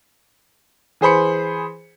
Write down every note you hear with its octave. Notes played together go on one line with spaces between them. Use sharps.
E3 G#4 C5 B5 C#7